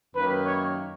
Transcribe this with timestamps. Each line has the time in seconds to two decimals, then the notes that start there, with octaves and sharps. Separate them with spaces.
0.15 F#2 D#3 A#3 B4
0.45 C#5